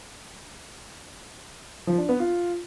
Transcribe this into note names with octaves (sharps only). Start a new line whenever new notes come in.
F3
D4
B3
F4